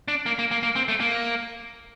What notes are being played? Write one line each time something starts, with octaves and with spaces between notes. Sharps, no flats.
D4
A#3
A#3
A#3
A#3
C4
A3
A#3